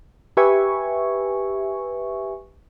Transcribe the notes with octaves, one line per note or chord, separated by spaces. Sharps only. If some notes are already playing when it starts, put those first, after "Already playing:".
G4 B4 E5 G#5 C#6